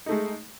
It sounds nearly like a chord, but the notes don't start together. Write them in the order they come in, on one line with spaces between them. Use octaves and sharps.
D#4 A3 G#3